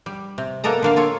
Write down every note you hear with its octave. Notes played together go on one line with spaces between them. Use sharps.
G3
C3
A#3 B3 A4 D#5 A#5
D3 A#3 F5
F4 A4 C#5